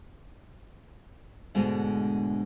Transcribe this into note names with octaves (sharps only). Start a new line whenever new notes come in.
G#2 B2 D3 G#3 A3